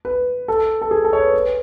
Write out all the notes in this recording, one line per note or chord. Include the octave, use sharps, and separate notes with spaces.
B4
A4
A4
G#4
A4
C#5
B4
B4